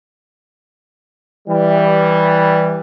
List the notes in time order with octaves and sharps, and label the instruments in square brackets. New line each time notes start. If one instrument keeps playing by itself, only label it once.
[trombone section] E3 G3